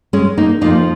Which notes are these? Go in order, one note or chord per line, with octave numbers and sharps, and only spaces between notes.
G#3 C#4
A#3 D#4
F2 F3 A#3 D#4